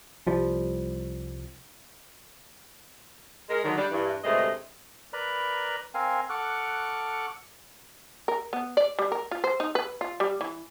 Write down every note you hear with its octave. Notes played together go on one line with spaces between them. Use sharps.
C2 F3 G3
G#3 A#4
D3 D#3 F#3
G3 D4
G2 E3
D2 G2 C3 G#3 A3 D#5
A#4 B4 D5 A#5 B5
C4 A#4 F5 G#5
A4 F#5 C#6 D6 F6 F#6
A#4
B3
D5
G3
A#4
F4
C5
D#4
B4
F4
G3
E3